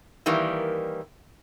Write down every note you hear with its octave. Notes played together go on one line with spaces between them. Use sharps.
D#3 E3 G3 A#3